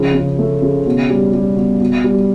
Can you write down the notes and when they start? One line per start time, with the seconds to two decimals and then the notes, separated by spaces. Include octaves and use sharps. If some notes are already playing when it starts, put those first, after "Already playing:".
Already playing: C#3 F3
0.15 C#3
0.39 A3
0.62 C#3
0.86 B2
1.10 G3
1.33 G3
1.56 B2
1.80 B2
2.04 G3